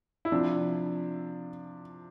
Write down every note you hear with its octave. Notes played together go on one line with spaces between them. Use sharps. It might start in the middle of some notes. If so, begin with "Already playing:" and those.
E4
C3 F3 D4